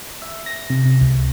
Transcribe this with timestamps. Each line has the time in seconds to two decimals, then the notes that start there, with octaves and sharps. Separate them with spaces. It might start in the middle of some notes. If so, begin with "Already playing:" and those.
0.22 E5
0.46 A#6
0.70 C3
0.85 C3
1.01 C#2